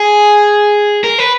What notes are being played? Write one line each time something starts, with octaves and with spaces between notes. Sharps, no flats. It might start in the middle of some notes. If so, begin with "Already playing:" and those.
Already playing: G#4
A#4
B4